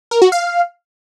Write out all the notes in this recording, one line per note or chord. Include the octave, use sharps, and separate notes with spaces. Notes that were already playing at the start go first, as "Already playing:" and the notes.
A#4
F#4
F5